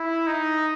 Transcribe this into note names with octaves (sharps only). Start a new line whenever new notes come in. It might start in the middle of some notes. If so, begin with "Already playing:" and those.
Already playing: E4
D#4